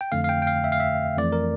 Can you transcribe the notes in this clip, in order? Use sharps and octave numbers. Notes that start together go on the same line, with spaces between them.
G5
F2 D3 A3 F5
F5
G5
G5
F5
E5
F5
E5
F2 E3 A3 D5
A#4